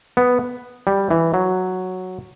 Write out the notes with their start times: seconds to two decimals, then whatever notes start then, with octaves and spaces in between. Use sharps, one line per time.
0.17 B3
0.87 G3
1.11 E3
1.34 F#3